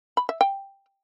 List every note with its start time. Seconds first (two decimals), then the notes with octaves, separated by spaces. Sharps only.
0.17 B5
0.29 E5
0.41 G5